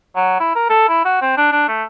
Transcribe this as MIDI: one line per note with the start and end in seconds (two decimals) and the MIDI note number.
0.16 0.36 54
0.40 0.53 64
0.55 0.68 70
0.69 0.85 69
0.89 1.03 64
1.05 1.20 66
1.22 1.34 60
1.37 1.50 62
1.52 1.66 62
1.68 1.83 57